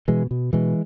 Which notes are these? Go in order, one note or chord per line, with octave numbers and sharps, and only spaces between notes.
B2 E3 G#3
B2
B2 E3 G#3